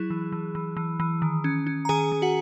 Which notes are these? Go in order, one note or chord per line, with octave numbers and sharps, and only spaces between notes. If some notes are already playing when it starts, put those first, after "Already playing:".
Already playing: F#3 E4 G#4
E3
E3
E3
E3
E3
D#3
C#4
C#4
A#5
D#3 G#4 G#5
D#3
F#4 F#5